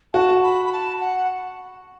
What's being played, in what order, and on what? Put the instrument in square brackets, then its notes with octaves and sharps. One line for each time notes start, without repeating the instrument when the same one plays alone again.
[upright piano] F#4 [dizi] A5
[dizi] B5
B5
A5
F#5